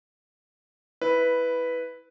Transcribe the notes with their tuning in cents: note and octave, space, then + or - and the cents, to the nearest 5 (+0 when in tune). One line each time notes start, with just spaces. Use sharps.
E4 -10 B4 +0